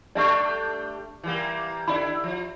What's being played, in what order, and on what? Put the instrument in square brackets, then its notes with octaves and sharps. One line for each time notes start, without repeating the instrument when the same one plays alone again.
[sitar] G3 A3 D4 [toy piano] D5 E5 C#6
[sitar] E3 G3 A#3
[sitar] D3 E4 [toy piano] D5 B5
[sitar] F3